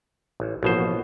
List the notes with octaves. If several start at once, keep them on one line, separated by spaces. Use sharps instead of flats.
A1
A1 B2 F3 A#3 F#4 C5